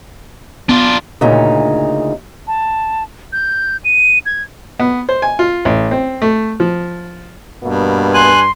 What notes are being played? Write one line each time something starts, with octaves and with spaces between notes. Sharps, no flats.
B3 D4 F4
D2 A#2 C#3 D#4
A5
G6
D#7
G#6
B3
C5
G#5
F4
A1
C4
A3
F3
G2 B2 A#3 B3
G#5 C6 F#6